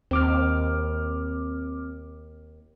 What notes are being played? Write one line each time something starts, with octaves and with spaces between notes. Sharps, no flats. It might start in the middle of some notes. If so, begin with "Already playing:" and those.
D#2 C4 D6 F6